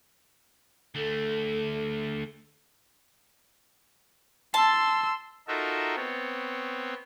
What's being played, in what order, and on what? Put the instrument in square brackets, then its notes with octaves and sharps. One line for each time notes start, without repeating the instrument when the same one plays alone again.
[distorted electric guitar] D2 A3 [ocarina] A4
[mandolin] A5 [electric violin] C6 E6
[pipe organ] D#4 F4 F#4 A4 A#4 E5
B3 C4 C#5